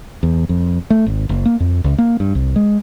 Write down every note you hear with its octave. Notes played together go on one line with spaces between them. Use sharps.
E2
F2
A3
G#1
F#1
A#3
F2
C#2
A#3
G2
C2
G#3